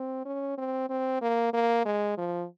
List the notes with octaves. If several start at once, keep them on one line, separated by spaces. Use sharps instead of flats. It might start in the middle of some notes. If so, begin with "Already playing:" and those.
Already playing: C4
C#4
C4
C4
A#3
A#3
G#3
F3